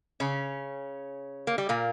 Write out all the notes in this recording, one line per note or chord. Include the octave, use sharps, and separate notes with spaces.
C#3 C#4
A#3
G3
A#2 A#3